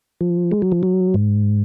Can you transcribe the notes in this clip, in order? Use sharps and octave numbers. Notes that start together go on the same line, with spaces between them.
F3
G#3
F#3
F3
F#3
G#2